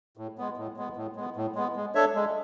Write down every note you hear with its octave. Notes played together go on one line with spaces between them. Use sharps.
A2
G#3 B3
A2
G#3 B3
A2
G#3 B3
A2
G#3 B3
G#3
D4 A4 C#5 E5
G#3